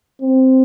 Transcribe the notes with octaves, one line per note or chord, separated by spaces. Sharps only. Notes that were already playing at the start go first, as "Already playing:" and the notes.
C4